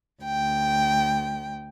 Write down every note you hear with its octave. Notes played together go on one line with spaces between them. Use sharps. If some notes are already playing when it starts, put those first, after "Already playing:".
D2 G5